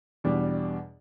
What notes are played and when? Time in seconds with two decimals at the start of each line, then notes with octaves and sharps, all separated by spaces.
0.24 E2 B2 G3 D4